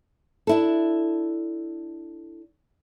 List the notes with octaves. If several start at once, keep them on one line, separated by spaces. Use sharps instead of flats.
D4 E4 A4